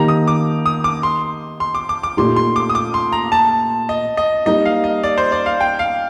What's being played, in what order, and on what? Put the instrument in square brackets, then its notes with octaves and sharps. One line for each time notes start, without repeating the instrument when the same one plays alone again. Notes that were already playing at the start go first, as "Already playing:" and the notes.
Already playing: [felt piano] D#3 A#3 D#4 G4 [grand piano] A#5
[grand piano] D#6
D6
D#6
D6
C6
C6
D6
D6
D6
[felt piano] A#2 A3 D#4 G4 [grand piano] C6
[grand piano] C6
D6
D#6
D6
C6
A#5
A5
D#5
D#5
[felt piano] G3 A#3 D#4 [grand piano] D#5
[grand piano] F5
D#5
D5
C5
D5
F5
G5
F5